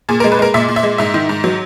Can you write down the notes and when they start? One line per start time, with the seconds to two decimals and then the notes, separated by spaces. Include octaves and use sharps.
0.09 A#2 G#4
0.20 A#4
0.24 G#3
0.32 B4
0.39 G#3 A#4
0.54 A#2 E5
0.68 A#2
0.76 E5
0.83 G#3
0.98 G#2 E5
1.14 D#3
1.29 G#2
1.44 F#3